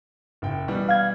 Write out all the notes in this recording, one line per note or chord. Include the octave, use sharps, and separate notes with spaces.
F#1 G5
B2 E3 G3
F5 G#6